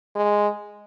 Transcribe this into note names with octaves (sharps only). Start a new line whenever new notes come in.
G#3